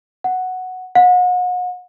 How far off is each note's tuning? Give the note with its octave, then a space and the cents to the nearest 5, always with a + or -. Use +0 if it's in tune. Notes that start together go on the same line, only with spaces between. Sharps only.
F#5 +0
F#5 -35